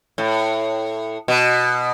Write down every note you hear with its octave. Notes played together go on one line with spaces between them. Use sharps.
A2
B2